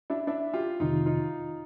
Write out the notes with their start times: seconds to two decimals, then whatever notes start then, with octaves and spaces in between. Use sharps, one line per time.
0.10 D4 E4
0.27 D4 E4
0.53 F4 G4
0.80 F2 C3 D#3 D#4 F4
1.06 D#4 F4